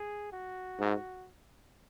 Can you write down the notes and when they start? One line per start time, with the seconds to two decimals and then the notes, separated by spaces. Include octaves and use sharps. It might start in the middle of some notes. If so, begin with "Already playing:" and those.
Already playing: G#4
0.32 F#4
0.80 G#2